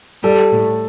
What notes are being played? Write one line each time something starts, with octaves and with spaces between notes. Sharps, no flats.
G3 A4
A2